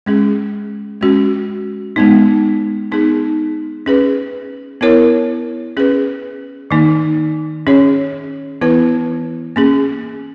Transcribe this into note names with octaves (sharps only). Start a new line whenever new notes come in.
G#3 C#4 G#4
G#3 C#4 F#4
G#3 B3 D#4
B3 D#4 G#4
C#4 G#4 B4
B3 E4 A#4 C#5
C#4 G#4 B4
D#3 A#3 D#4
C#4 G#4 C#5
E3 B3 E4 B4
A#3 C#4 G#4